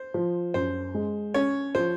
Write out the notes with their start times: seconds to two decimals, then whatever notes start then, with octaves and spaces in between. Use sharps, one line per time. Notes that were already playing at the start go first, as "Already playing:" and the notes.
Already playing: C5
0.14 F3
0.54 F#2 C5
0.95 G#3
1.34 C#4 C#5
1.75 F3 C5